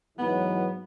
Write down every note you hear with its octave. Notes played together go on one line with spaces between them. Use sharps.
G#2 E3 F#3 B3